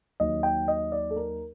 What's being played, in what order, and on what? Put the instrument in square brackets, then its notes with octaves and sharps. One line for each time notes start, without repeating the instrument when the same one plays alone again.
[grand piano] D#2 D#3 F#3 D#5
G5
D#5
D5
A4
A#4